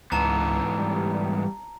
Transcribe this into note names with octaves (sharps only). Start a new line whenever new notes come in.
C#2 G#2 E3 B3 A5 A#5
G3